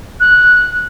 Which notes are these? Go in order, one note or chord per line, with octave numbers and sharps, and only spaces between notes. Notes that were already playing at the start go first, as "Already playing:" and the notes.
F#6